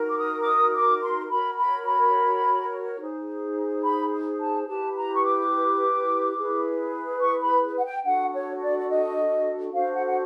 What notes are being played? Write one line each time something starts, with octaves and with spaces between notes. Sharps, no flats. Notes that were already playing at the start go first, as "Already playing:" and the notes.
Already playing: D#4 F#4 A#4
D6
D#6
D6
D#6
D6
C6
F#4 A#4 C#5 B5
B5
B5
D#4 G#4 C5
B5
A5
E4 G4 B4 A5
A#5
C#6
D6
E4 G#4 B4
C#6
B5
F#5
G5
D4 F#4 A4 F#5
C#5
D5
D5
D#5
D4 F#4 A4 C5 F5
F#5
F#5